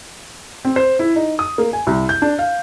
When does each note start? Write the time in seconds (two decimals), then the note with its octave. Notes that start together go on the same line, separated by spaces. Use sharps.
0.65 C4
0.76 C5
0.99 E4
1.16 D#4
1.39 D#6
1.58 A#3
1.73 G#5
1.87 C2
2.09 G6
2.22 D4
2.39 F5